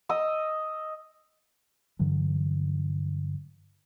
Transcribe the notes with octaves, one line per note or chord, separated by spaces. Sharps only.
D#5 D#6 E6
G2 D3 E3 F#3